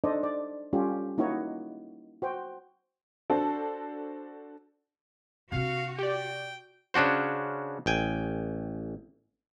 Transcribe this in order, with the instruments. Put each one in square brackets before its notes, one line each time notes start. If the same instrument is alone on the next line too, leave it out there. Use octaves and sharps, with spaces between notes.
[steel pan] D4 D#4 A4 C5 D5 D#5
D5
G3 C#4 F4 G4 A4
A#3 D#4 E4 F#4 C#5 D#5
F#4 C5 G5
[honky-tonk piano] D4 F#4 A4 C5
[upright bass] C3 D4 [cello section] F#4 [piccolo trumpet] F5
[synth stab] G4 D5 [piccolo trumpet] G5
[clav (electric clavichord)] C#3 C#4 D4 F#4 C5
A1 G5 G#5